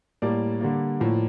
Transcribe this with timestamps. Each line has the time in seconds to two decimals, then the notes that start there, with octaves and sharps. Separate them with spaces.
0.22 A2 G3 A#3 D5
0.61 D3 G3 A#3
1.00 A2 F3 A#3